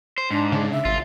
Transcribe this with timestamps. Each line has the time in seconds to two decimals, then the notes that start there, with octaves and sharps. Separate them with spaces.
0.18 C5
0.31 G#2 D4
0.52 C#3
0.71 E5
0.85 G#1 F4